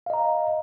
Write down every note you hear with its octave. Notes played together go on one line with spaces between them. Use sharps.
D#5 F5 A#5